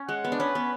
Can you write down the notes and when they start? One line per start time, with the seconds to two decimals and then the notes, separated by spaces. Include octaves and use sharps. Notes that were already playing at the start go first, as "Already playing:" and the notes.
Already playing: C#4
0.08 G#3 F#5
0.24 B3
0.32 D4
0.39 C#4 B4
0.55 B3